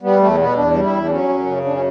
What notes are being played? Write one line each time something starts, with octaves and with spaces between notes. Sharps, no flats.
G3 B3
E2 A3
B2 B3
E2 D4
G3
E4
E2
D4
F#3 C#4
F#2
C#3
F#2 D4
C#4